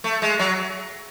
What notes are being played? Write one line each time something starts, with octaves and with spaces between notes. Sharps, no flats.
A3
G#3
F#3